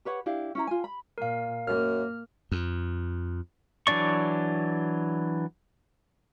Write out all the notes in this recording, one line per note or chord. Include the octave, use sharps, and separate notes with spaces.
G4 B4 C#5 F#5
D4 E4 G4 F5
C#4 E4 A#5
F4 G#5
B5
A#2 A#4 F5
F#2 A#3 F6
F2
E3 F#3 D4 D5 C#6